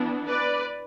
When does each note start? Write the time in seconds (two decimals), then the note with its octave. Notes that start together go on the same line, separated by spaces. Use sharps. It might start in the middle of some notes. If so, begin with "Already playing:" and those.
Already playing: E3 B3 D4
0.28 B4 D5